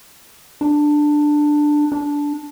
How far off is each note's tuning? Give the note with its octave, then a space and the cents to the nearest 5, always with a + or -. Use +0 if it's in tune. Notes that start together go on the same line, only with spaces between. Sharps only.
D4 +10
D4 -10